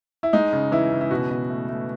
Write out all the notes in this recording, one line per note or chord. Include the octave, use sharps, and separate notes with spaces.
E4
G#3 D#4
C#3
E3 E4
C#3
E4
B2 F#4
B2
A3
A3